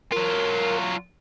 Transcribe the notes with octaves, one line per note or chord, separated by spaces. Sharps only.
F#3 F4 A#4